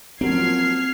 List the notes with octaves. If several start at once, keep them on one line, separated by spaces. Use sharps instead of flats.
F3 F#3 A#3 C4 F6 G#6 C7